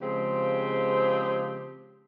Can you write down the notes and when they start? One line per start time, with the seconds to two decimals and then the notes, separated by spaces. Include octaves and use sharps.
0.01 C#3 F3 G#3 C4 G4 C5